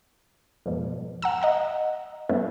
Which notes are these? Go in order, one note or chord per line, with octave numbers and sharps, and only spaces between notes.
F2 G#2 B2
F#5 A#5 E6
D#5 F#5 A#5
G2 A3 B3 C#4 E4